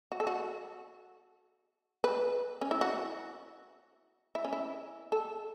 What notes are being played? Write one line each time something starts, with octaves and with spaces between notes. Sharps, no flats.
F#4
A4
F#4
B4
C#4
E4
F#4
E4
C#4
E4
A4